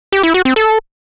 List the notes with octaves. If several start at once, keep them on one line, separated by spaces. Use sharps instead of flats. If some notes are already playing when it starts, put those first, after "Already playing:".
G4
E4
F#4
C4
A4